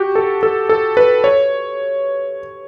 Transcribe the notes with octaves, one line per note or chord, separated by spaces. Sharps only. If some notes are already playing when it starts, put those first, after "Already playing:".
Already playing: F#4 G4
A4
A4
A4
B4
C#5